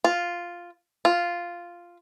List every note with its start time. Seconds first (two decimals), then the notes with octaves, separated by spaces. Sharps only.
0.04 F4
1.05 F4